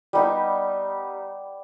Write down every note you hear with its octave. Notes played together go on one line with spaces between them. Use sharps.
G3 B3 D#4 G4